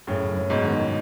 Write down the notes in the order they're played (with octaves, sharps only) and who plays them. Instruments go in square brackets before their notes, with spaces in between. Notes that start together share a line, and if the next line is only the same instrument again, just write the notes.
[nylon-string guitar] F#2 [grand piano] A2 C#3
[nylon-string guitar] F#2
[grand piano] G#2 B2
[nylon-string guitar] D#3